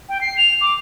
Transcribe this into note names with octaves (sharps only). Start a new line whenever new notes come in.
G5
C7
F7
D6